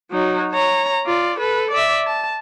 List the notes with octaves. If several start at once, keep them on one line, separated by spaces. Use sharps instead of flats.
F#3 D#4
C#5 A#5
F4 D5
A4 B4
D5 E5
A5